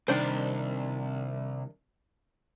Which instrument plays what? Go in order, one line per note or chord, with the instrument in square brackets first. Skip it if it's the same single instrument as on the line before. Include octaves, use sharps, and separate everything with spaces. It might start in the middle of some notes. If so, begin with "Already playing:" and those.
[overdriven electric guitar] C2 [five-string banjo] D#3 D4 C5